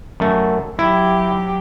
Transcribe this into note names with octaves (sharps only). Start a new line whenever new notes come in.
F#2 A3
F#3 E4 G4